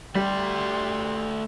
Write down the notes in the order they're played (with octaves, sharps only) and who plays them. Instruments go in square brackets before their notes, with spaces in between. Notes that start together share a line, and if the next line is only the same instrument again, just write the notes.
[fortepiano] G3 [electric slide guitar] A3 D5 [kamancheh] G4 C6